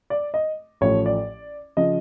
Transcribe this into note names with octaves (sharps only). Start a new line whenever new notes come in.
D5
D#5
A1 A2 F3 A3 C#5
D5
C#3 F3 D#5